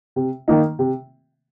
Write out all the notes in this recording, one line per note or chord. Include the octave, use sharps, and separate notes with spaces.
C3
D#3 A#3 D#4
C3